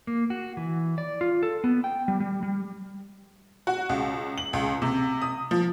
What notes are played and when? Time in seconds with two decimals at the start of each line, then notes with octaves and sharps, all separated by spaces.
0.07 A#3
0.30 F#4
0.57 E3
0.98 D5
1.21 F4
1.43 A4
1.64 B3
1.84 G5
2.08 G3
2.20 G3
2.43 G3
3.67 F#4
3.89 C#2
4.38 F#7
4.53 C#2
4.82 C3
5.22 D#6
5.51 F3